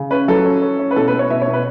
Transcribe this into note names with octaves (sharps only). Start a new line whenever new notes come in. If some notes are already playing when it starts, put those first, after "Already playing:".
Already playing: C#3
C#4 B4
F#3 A4
C#4
C#4
C#4
B4
B2 A4
B4
B3
C#5
B2 E5
C#5
B2
B4